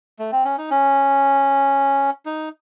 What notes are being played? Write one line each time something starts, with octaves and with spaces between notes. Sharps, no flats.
A3
C4
C#4
D#4
C#4
D#4